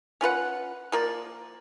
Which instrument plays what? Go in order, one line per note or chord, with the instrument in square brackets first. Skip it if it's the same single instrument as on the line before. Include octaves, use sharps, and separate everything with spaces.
[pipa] C#4 F4 B4 F#5
F3 A#3 D5